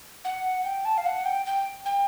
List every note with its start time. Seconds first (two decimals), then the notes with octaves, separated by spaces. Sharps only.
0.25 F#5
0.65 G5
0.85 A5
0.97 F5
1.06 F#5
1.25 G5
1.46 G5
1.86 G5